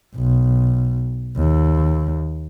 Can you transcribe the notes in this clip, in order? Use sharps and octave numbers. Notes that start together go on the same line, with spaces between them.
B1
D#2